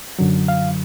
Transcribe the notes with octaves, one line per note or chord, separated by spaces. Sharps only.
F#2 D3 F#3
F5